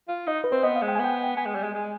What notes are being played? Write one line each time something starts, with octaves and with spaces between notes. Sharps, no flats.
F4
D#4 D#5
B4
C4 C5
B3 D#5
F5
G#3
G5
G#5
B3 G5
B3 G#5
G#3
G3
G#3
G#3